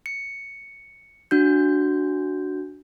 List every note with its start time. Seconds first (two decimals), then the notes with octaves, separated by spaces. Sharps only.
0.06 C#7
1.31 D4 F#4 G6